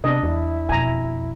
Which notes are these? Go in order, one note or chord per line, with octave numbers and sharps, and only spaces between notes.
C3 B3 D4 D#5
E2 E4
F2 B2 G#5 A#5